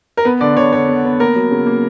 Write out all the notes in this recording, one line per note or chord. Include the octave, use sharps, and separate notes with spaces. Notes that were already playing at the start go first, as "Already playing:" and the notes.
A#4
B3 B4
D3 D5
D3 C#5
D3 C#5
B3
B3
A#3 A#4
F#3
C#3
A#3